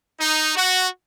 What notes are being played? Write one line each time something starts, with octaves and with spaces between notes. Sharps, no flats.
D#4
F#4